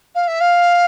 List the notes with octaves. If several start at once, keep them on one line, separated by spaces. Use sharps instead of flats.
F5
E5
F5